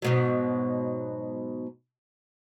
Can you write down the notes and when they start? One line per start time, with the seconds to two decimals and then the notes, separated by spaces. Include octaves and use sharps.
0.02 G#2 B2 F#3